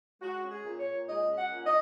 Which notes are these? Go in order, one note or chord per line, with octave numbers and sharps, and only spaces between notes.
G#3 F#4
C#4
G#4
A#2
C#5
A#2
G#3 D#5
C#4
F#5
A#2
D#5